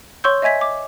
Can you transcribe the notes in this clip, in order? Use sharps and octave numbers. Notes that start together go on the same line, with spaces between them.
C#5 C6 C#6 E6 G6
D#5 E5 G#5 G#6 B6
D6